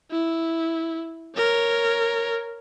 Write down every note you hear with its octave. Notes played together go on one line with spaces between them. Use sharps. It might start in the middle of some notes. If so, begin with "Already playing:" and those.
E4
A#4 C#5